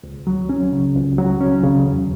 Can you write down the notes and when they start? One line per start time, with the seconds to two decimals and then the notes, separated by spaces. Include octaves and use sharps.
0.04 C#2
0.27 F#3
0.49 C#4
0.72 C#3
0.95 C#2
1.18 F#3
1.41 C#4
1.64 C#3
1.87 E2